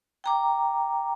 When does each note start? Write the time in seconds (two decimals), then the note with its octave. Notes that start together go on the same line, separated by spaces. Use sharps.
0.24 G5 A#5 D6